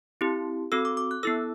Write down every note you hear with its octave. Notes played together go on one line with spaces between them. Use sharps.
C4 E4 G4
C4 F#4 A4 E6
D6
D6
F#6
B3 E4 A4 E6